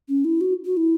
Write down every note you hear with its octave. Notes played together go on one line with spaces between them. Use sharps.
C#4
E4
F#4
F#4
E4